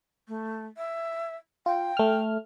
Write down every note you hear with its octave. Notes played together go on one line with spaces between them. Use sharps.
A3
E5
F4 G5
A3 F6